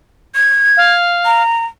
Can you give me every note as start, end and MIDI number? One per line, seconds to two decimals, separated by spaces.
0.35 0.92 92
0.77 1.42 77
1.25 1.65 82